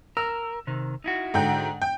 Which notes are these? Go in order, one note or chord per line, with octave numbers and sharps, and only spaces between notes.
A#4 E6
C3 D#3
D#4 E4 F#4
G#2 D3 G5
G5